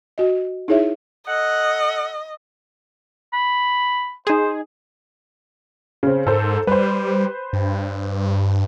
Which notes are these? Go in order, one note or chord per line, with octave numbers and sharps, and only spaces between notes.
F#4 D#5
D#4 E4 G#4 C#5 E5
A4 D#5 F#5
B5
D#4 G#4 C5
C#3 C4
G#2 A4 A#4 C5
G3 B4 C5
G2